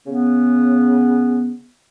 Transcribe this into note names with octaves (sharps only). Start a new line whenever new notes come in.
C#3 B3